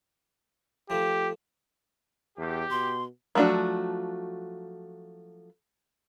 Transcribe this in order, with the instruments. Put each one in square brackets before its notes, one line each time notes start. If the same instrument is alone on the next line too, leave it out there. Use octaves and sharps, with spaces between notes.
[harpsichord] F3 A3 [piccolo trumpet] G4
[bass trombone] E2 [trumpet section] G4
[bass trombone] B2 [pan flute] C6
[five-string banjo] F3 F#3 A3 D4 F#4